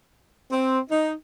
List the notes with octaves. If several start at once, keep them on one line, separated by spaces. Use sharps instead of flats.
C4
D#4